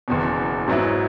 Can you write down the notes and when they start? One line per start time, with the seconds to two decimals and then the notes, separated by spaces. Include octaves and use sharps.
0.08 F#1 E2 B2
0.68 G#2 F#3 B3 E4